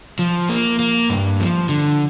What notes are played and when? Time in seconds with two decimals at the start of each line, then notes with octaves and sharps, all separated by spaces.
0.19 F3
0.49 A#3
0.79 A#3
1.09 G2
1.39 F3
1.69 D3